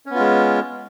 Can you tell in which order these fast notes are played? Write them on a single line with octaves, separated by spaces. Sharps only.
C#4 B3 F4 G#3